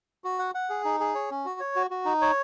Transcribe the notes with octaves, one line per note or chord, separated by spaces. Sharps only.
F#4
F#5
F#5
G#4
D#4
G#4
C#5
C#4
F#4
C#5
F#4
F#4
D#4
C#5